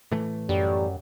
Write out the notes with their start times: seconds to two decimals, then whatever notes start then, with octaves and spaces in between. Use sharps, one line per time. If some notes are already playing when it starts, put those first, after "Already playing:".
0.11 A2 E3 A3
0.49 F#2 G3